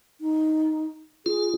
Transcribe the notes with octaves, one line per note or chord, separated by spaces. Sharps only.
D#4
F4 G#4